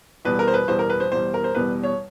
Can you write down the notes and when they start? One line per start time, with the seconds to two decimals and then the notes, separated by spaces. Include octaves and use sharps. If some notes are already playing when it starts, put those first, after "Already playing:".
0.25 E2 B2 G3 B4
0.39 A#4
0.48 C5
0.54 B4
0.68 E2 B2 G3 C5
0.79 A#4
0.90 B4
1.00 C5
1.11 E2 B2 G3 C5
1.34 A#4
1.44 C5
1.55 E2 B2 G3 B4
1.84 C#5